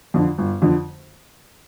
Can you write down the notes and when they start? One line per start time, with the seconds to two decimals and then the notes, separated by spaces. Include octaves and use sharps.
0.14 F2 D3 F3
0.38 G1
0.62 F2 D3 F3